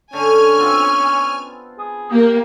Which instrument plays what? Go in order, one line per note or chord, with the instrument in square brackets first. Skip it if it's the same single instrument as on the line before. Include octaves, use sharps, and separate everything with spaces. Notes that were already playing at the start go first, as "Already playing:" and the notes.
[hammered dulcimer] D3 [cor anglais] C#4 [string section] G#5 F6
[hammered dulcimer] B3 C4 F4
[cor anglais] G#4
[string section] A#3 [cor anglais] G4